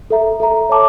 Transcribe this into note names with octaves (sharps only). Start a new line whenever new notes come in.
A4 E5 A#5
A4 E5 A#5
C#5 E5 A5 D6